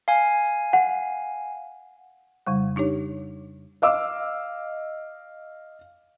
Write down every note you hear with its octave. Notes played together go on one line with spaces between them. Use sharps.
F5 G#5
F#5
F2 C#3 G3
D4 D#4 G4 C#5
D#5 F5 D6 E6